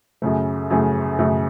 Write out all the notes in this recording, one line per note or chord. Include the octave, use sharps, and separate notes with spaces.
F#2 C#3 A3
F#2 C#3 A3
F#2 C#3 A3